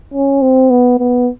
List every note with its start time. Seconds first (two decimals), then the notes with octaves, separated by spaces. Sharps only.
0.14 C#4
0.42 C4
0.70 B3
0.99 B3